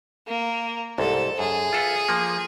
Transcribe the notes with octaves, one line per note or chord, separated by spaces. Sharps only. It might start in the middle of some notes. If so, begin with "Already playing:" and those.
A#3
C2 G#2 A4
F#2 G#4
F4 A4 B4
F3 A#3